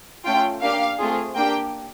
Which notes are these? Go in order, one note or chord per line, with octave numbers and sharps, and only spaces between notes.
A3 C#4 F4 G5
A#3 D4 G4 F5
A3 C4 F4 G#4
A#3 D4 G4 G5